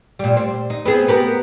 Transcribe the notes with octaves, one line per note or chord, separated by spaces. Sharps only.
A#2 G3
C4
D#4
B3 C4 G#4
B3 G4 A#4